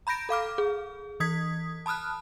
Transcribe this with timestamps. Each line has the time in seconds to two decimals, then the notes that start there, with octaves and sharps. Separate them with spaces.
0.07 A#5 B5 G6 A#6 D7
0.29 A4 F5 D6 F6
0.58 G#4
1.20 E3 D#6 G#6 B6
1.86 A5 B5 D#6 F6 F#6